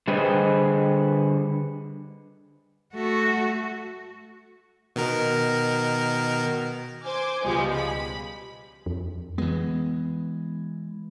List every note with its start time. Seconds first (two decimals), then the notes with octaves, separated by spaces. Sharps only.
0.07 D3 G3 G#4 B4 C5 D#5
2.94 A3 F#4
4.96 B2 D#3 A#4
7.04 C5 G#5 D6
7.44 C#2 B2 F3 G3 G#3
7.75 B5
8.86 F2
9.38 E3 G#3 B3